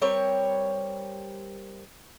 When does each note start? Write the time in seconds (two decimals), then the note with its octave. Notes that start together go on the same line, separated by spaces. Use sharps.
0.01 G3 C4 A#4 C#5